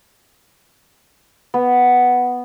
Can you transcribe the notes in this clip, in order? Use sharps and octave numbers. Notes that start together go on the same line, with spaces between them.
B3